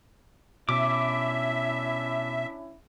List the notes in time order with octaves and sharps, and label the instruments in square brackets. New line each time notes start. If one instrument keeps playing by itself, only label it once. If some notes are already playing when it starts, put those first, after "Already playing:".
[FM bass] B2 [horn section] C#4 D4 E4 [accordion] E5 [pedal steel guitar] D6